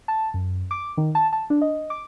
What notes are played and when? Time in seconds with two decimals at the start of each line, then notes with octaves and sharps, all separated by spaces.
0.08 A5
0.34 F#2
0.71 D6
0.97 D#3
1.15 A5
1.33 A5
1.50 D4
1.62 D#5
1.90 D6